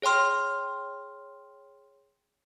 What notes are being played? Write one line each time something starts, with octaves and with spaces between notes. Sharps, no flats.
G#4 C#5 G5 C6 F6